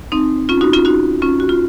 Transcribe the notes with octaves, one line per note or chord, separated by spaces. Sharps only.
C4 D#4
C#4 F4
D#4 F#4
C#4 F4
D#4 F#4
C#4 F4
F#4
F4